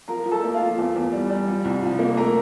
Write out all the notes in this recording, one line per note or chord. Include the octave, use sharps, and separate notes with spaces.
F3 A#4 A#5
F3
A4 A5
A#3
F4 F5
F3
E2
E2
G3
G3
F3
C2
F3
A#3
A3 A#4 A#5